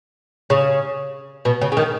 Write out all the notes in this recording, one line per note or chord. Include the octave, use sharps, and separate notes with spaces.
C#3
B2
C#3
C#3
D#3